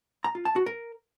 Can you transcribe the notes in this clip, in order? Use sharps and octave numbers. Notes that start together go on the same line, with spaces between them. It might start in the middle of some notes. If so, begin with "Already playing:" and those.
A#5
F4
A5
F#4
A#4